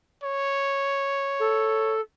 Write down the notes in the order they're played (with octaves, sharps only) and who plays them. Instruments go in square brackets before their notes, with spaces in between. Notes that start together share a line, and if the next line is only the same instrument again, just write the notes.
[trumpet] C#5
[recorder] A4